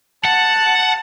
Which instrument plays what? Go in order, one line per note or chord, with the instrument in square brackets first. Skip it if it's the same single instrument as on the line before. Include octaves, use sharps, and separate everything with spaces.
[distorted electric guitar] F#5 [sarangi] A5